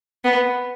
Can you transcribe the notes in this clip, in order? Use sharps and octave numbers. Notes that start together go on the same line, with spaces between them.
B3